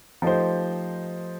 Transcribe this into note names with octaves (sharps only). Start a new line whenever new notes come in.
F3 A3 D#4 G4 C5